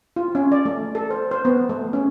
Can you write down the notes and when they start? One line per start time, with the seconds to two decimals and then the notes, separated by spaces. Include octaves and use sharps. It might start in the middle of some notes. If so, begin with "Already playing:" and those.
0.16 F4
0.35 C#4
0.52 D5
0.66 A3
0.95 A4
1.11 C5
1.31 C5
1.45 B3
1.69 A3
1.93 C#4